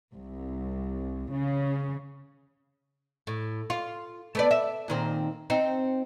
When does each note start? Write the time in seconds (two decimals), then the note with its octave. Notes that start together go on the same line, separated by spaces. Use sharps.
0.13 C2
1.30 C#3
3.27 A2
3.70 F4
4.35 A3 B3 D5
4.51 E5
4.88 A#2 D#3 C4
5.50 C4 D#4